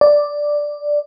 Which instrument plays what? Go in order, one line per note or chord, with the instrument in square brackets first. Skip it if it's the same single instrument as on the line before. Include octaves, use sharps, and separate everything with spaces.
[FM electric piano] D5